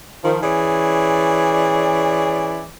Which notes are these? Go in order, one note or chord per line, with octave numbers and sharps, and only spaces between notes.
D#3 F3
E3 C#4 G#4 D5